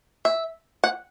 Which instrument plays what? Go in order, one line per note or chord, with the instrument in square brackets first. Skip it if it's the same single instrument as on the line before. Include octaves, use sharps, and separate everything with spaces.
[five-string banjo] E5
F#5